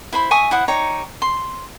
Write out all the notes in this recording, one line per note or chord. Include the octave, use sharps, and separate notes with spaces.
E4 C5 B5 C6
E5 G#5 C#6 D#6
E4 C5 F#5 D#6
D#4 G4 C#5 A#5
C6